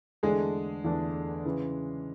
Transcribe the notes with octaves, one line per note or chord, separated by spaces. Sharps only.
E2 D3 G#3 A3 D4 G#4
E2 D3 A3 D4
C#3 E3